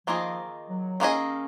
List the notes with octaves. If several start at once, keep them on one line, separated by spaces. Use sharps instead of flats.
D#3 F3 A#3 F4 G#4 D#5
F#3
D#3 A#3 C#4 F4 G#4 D#5